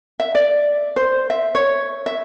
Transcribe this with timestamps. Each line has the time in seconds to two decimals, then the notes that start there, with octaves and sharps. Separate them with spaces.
0.20 E5
0.35 D5
0.96 C5
1.30 E5
1.55 C#5
2.06 E5